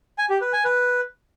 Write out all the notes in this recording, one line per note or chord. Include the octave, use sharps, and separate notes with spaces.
G#5
G4
B4
G#5
B4